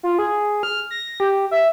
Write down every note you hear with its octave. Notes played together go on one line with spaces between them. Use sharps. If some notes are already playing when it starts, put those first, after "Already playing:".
F4
G#4
F6
A#6
G4
E5